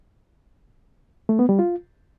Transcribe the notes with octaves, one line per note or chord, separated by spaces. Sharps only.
A3
B3
G3
F4